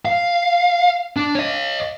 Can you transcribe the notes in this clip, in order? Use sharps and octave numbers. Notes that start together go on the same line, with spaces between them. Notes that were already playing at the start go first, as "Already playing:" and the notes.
F5
D4
C#5 D#5